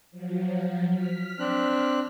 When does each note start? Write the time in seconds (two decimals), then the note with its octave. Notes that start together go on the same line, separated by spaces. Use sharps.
0.11 F3 F#3
0.92 F6 B6
1.40 C4 D4 F#6